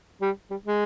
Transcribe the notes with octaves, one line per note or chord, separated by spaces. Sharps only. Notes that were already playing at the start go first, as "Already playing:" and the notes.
G3
G3
G#3